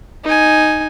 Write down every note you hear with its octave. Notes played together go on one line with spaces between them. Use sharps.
D#4 G#5